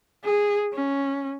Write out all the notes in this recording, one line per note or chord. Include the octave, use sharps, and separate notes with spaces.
G#4
C#4